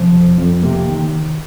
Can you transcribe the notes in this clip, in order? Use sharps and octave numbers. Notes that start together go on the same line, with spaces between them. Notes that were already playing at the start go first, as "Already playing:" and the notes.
Already playing: C3 F3
F2
F2
C3 A#3
D#3